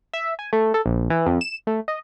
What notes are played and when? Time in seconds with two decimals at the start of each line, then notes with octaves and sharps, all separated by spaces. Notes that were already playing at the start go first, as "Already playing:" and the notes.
0.13 E5
0.39 G#5
0.53 A3
0.74 A4
0.86 A#1
1.10 E3
1.26 F2
1.41 E7
1.67 A3
1.88 D#5